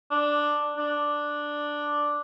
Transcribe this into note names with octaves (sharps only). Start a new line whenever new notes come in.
D4
D4